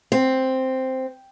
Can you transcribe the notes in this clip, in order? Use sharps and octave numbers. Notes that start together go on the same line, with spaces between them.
C4